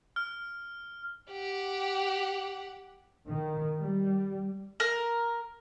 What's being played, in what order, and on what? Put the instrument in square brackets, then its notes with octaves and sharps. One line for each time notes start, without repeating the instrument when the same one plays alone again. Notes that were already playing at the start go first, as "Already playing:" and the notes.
[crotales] F6
[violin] G4 F#5
[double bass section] D#3
G3
[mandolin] A#4